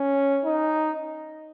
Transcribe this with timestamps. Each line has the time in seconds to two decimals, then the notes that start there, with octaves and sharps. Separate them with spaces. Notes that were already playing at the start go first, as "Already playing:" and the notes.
Already playing: C#4
0.45 D#4